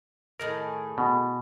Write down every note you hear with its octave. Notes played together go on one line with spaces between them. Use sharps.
A2 D#3 G#4 A#4
B2